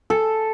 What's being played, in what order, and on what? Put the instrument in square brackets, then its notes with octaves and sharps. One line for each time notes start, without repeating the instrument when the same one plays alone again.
[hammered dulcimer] A4